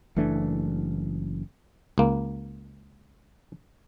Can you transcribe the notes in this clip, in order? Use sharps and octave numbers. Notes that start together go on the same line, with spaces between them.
F#1 E3 A3 D4
C#2 A#3